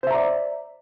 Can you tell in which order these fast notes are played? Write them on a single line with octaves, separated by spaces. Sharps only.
C5 E5 A#5 D5